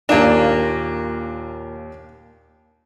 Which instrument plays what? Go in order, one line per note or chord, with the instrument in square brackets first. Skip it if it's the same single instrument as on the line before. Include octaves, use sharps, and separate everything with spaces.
[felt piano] D#2 D7 E7 [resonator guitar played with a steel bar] A#2 A#3 [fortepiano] D4